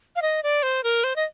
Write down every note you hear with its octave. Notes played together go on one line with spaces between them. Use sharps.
F5
D#5
D5
C5
A#4
C5
D#5